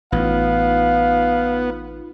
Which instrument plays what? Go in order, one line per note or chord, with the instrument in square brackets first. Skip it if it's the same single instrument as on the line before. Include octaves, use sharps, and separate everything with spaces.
[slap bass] A1 [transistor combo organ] B3 [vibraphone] D#4 F4 [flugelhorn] F5